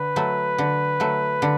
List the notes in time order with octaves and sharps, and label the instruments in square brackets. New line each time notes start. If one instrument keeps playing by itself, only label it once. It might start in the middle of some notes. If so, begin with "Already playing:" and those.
Already playing: [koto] D3 [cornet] B4
[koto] F#3 A3
D3
F#3 A3
D3